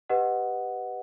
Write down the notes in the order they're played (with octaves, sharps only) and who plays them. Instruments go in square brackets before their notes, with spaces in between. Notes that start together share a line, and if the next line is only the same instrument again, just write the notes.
[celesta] G4 B4 D#5 F#5